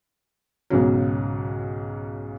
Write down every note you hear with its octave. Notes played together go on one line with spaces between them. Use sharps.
B1 G#2 C#3 F#3